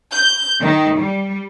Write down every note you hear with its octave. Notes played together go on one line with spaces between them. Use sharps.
G6
D#3
G3